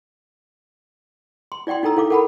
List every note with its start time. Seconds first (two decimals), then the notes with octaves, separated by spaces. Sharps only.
1.52 C6
1.67 E4 D5 F#5 G5 C6
1.83 D#4 E4 A4 A#5 E6
1.96 E4 A4 F5 D6
2.10 A4 A#4 F#5 A5 B5